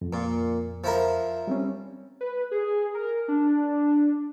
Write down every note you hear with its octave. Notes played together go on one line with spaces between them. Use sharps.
F2
A#2
F3 E4 A#4
G3 C4 C#4
B4
G#4
A#4
D4